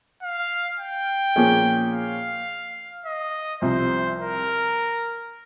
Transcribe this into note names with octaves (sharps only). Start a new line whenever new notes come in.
F5
G5
A#2 F3 A#3 C#4 G#4
F5
D#5
C2 C3 F3 C5
A#4